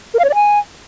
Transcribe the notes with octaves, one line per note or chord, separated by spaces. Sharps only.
A#4
F5
C#5
D5
G#5